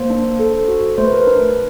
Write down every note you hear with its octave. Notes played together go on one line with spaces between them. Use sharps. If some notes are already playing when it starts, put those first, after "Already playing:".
Already playing: A#3 C5
D4
A4
F#4
A3 C5
B4
A#4
B4
D4